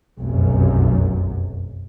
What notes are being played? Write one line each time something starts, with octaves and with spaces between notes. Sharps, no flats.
F1 B1 F#2